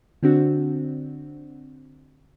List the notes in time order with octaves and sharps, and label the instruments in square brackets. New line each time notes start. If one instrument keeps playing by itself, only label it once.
[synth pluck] D3 C4 D4 F#4